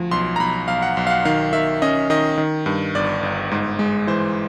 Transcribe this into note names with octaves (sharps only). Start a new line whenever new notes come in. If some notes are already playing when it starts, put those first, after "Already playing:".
Already playing: D2 F3
B1 C6
A#5
B1 B5
B1 F5
F#5
B1
F5
F#5
D#3 F5
D#3 E5
C#4 D#5
D#3 D#5
D#3
G2
G1 D5
G1
G#2
G#3
E3 C5